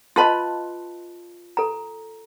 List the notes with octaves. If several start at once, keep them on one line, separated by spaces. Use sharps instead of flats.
F4 B4 D#5 A5 B5 C6
A4 A#5